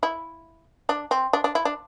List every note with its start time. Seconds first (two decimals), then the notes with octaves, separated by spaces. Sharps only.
0.03 E4
0.89 D4
1.11 C4
1.33 D4
1.44 D4
1.55 E4
1.65 D4